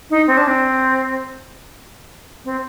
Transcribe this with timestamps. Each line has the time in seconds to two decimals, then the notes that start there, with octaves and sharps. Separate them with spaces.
0.10 D#4
0.27 C4
0.37 D4
0.48 C4
2.45 C4